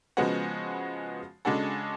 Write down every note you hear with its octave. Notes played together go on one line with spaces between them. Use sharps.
C#3 F3 G#3 B3 F#4
C#3 G#3 D4 F#4 A4